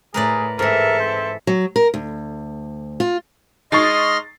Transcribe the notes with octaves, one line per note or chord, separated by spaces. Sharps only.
A2 G#4 A#4 B4 D5
G#2 E3 A4 A#4 E5
C4
F#3
A#4
D2
F4
G#3 D#4 D#5 C6 C#6 F6 A6 C7